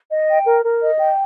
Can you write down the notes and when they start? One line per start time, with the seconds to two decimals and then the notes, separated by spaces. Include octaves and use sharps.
0.11 D#5
0.29 G5
0.46 A#4
0.64 A#4
0.82 D#5
0.99 G5